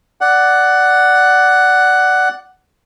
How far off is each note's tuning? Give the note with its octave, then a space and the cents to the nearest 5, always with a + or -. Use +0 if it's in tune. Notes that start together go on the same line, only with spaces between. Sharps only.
D5 +0 F#5 +10